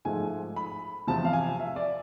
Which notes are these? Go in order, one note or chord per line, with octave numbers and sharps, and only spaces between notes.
G#2 F3 A3 G#5
B5
E2 C3 F3 A5
F5
G#5
E5
D5